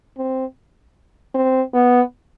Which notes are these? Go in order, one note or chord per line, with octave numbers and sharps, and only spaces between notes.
C4
C4
B3